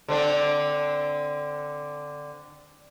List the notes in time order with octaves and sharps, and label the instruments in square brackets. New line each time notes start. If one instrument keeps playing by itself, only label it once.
[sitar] D3 C4 D4